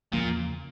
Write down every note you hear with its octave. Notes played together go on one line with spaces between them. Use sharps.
E2 A#2 C#3 F3 A#3